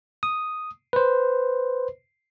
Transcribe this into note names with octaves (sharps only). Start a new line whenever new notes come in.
D#6
B4 C5